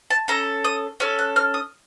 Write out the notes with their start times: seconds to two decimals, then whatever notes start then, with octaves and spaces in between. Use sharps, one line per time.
0.10 A5
0.28 C#4 A4 A#5
0.64 D#6
1.00 C#4 A4 F6
1.19 F#6
1.36 F6
1.54 D#6